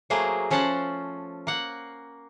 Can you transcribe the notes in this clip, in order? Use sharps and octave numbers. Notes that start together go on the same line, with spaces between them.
F#3 A3 A#3 G#4 C5
F3 C#4 C5 F#5 A5
A#3 F#5